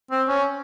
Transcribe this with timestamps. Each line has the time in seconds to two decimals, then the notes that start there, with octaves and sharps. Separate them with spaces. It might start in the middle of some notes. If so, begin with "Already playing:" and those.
0.11 C4
0.29 C#4